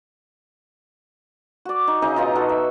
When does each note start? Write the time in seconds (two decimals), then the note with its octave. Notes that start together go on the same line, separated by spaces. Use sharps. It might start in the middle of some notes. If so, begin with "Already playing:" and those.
1.65 F#4 D5
1.88 D#4
2.02 C#3 D#4 D#5 E5
2.16 B2 F4 A#5
2.35 F#4 A4
2.49 E5